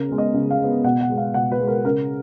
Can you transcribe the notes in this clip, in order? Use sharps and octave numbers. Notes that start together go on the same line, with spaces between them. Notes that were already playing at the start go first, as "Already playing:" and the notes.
Already playing: C#3 A#4
G#3 B3
D#5
C#3
F5
G#3 B3
B2 F#5
F#5
G#3 B3
F5
B2 F#5
B4
G#3 B3
A#4
C#3 A#4